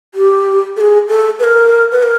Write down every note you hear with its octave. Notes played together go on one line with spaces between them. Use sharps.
G4
A4
G#4
A4
B4
A#4
B4
A#4